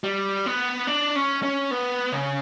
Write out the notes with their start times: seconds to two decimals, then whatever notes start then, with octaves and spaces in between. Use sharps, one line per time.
0.04 G3
0.46 B3
0.87 D4
1.16 C#4
1.43 C#4
1.71 B3
2.12 C#3